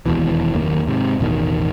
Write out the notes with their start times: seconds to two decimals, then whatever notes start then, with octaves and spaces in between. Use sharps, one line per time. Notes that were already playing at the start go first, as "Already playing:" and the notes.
0.06 E1 D#2 B2 E3
0.54 F#1 D#2 D#3 A#3
0.88 G#2 C3
1.20 A1 E2 B2 D#3